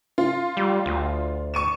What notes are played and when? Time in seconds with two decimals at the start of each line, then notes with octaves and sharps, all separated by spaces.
0.18 F4
0.57 G3
0.86 D2
1.54 C#6 D#7 E7